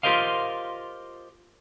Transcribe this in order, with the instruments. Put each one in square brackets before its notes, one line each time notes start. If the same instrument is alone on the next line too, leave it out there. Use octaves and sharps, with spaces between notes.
[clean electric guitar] F4 G4 A#4 C5 D#5 F5